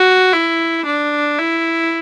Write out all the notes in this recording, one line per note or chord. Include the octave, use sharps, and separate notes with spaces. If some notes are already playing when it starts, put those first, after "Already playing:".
Already playing: F#4
E4
D4
E4